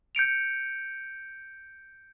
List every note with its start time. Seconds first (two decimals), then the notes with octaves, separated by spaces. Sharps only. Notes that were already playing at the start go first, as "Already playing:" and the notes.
0.15 G6 C#7 D7 F7